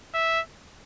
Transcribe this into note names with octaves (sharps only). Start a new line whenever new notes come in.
E5